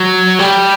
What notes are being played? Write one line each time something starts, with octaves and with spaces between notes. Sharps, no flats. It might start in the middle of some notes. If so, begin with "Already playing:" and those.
Already playing: F#3
G3